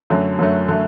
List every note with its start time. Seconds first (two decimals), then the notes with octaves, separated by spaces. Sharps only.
0.10 F#2 D3 F#3 A3
0.39 F#2 D3 F#3 A3
0.68 D3 F#3 A3